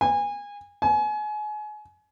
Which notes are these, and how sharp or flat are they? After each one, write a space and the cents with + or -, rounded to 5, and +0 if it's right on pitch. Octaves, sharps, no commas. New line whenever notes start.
G#5 -25
G#5 +30